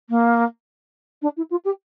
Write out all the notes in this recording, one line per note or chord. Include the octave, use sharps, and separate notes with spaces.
A#3
D4
E4
F4
G4